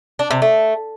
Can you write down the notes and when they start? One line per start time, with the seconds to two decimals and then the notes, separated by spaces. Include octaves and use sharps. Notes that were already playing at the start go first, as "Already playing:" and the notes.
0.19 D4
0.31 C3
0.42 A3